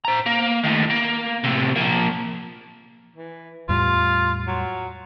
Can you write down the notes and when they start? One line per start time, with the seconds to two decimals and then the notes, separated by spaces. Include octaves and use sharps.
0.05 C5 A#5
0.26 A#3
0.63 A2 D#3
0.90 A#3
1.44 A2 C3
1.76 F3 A#3
3.16 E3
3.69 E2 A2 G3 F4
4.47 F#3